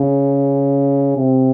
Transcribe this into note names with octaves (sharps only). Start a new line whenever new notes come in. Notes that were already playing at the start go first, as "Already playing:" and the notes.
Already playing: C#3
C3